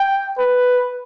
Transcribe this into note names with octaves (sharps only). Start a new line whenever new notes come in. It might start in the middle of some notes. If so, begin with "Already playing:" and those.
Already playing: G5
B4